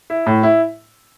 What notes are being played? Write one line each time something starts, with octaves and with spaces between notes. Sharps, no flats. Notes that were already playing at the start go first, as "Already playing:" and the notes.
E4
A2
E4